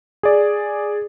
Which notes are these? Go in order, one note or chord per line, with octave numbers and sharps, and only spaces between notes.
G#4 D5